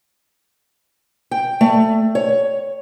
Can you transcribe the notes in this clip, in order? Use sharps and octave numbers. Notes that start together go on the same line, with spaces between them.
G5
A3
C#5